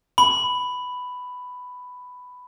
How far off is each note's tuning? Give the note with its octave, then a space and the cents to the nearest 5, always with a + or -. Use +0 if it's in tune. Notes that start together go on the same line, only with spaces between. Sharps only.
B5 +10